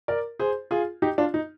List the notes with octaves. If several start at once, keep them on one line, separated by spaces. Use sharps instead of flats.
A#4 D5
G#4 C5
F4 G#4
D#4 G4
D4 F4
D#4